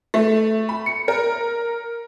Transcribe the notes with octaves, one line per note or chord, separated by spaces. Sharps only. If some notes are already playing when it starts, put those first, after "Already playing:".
A3
B5
C#7
A#4